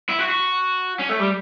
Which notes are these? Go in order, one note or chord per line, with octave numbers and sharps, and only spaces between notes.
E4
F#4
F#4
C#4
A3
G3